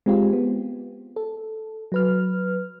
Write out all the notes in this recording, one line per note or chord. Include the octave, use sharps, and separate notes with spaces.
G#3 C4 F4 G4
B3
A4
F#3 B4 F6